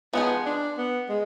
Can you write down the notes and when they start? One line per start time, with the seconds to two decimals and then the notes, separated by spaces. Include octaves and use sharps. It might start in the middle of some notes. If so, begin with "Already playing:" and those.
0.13 F3 G#3 B3 D#4 G#4
0.46 D4
0.78 B3
1.09 G#3